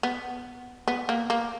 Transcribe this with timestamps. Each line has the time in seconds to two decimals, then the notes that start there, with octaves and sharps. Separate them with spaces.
0.03 B3
0.88 B3
1.09 A#3
1.30 A#3